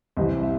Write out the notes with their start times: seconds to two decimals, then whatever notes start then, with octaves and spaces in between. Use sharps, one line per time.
0.17 C2 C3 E3 C4 D#5
0.43 E5